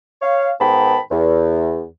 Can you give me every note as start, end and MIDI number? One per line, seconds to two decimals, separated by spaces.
0.22 0.50 73
0.22 0.50 77
0.61 0.99 44
0.61 0.99 51
0.61 0.99 59
0.61 0.99 79
0.61 0.99 81
0.61 0.99 83
1.11 1.85 40